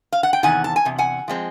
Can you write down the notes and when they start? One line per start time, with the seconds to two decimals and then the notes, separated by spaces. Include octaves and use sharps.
0.12 F5
0.23 F#5
0.33 G5
0.43 E2 C3 D#3 F#5 G#5
0.64 A5
0.76 G#5
0.85 E2 C3
0.98 F#5 G#5
1.28 F3 G#3 C4